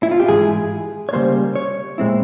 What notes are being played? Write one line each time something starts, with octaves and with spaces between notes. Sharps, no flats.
E4
F4
G4
G#2 E3 G#3 E4 G#4
C#5
C#3 G3 A#3 C5
C#5
A#2 G#3 C4 E4